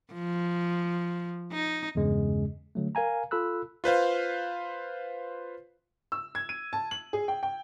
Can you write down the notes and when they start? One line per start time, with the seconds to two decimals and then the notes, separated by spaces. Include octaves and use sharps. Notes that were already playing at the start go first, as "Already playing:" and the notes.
0.13 F3
1.52 D#4
1.95 E2 G2 C#3 G#3 C#4
2.75 D3 F#3 A3
2.95 A#4 F5 G#5 A#5
3.31 F4 A4 B5 E6 F#6
3.84 F4 B4 C5 F5
6.12 E6
6.35 G#6
6.49 D#7
6.73 A5
6.91 F#7
7.13 G#4
7.28 G5
7.43 G5